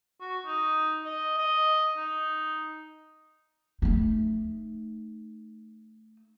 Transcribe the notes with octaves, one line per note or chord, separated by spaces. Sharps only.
F#4
D#4
D#5
D#5
D#4
A3 D#4